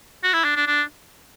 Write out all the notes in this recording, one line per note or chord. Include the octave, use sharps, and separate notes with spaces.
F#4
E4
D4
D4
D4